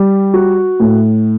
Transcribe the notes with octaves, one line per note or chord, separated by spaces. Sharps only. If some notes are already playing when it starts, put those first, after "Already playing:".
Already playing: G3
F#4
A2